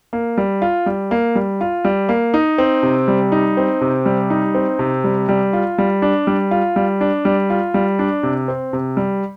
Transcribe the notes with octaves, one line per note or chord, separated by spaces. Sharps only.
A#3
G3
F4
G3
A#3
G3
F4
G3
A#3
D#4
C4
C3
G3
D#4
C4
C3
G3
D#4
C4
C3
G3
G3
F4
G3
D4
G3
F4
G3
D4
G3
F4
G3
D4
C3
C4
C3
G3